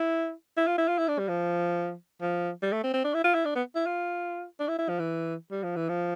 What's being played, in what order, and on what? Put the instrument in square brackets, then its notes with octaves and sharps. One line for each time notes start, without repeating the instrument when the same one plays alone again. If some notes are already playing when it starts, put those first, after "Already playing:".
Already playing: [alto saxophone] E4
E4
F4
E4
F4
E4
D4
G3
F3
F3
G3
A3
C4
C4
D4
E4
F4
E4
D4
B3
E4
F4
D4
E4
E4
F3
E3
G3
F3
E3
F3